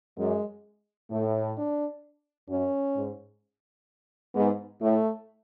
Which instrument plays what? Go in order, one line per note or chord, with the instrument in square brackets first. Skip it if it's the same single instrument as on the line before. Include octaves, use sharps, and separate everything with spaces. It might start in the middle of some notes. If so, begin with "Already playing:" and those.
[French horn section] F#2 [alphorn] G#3
[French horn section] A2 [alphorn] A3
[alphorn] D4
[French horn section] F#2 [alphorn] C#4
[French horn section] G#2
[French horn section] G#2 [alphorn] B3
[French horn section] A2 [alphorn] A3